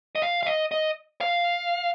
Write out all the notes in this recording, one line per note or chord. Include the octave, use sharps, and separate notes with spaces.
D#5
F5
F5
D#5
D#5
F5